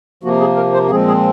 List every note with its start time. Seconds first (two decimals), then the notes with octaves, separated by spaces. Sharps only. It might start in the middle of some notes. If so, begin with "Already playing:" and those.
0.23 C3 F3 A#3 F#4
0.40 G#4
0.57 A#4
0.74 C5
0.91 A#2 F3 G#3 C4 G#4
1.08 G#4